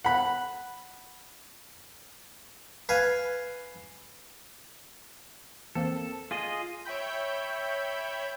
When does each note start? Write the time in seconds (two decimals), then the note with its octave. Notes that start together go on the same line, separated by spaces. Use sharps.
0.05 F#5 B5
2.89 B4 F5 G#5
5.75 E2 A#3 C4 A4
6.31 F4 G#4 D#5
6.85 C#5 E5 G5 B5 G6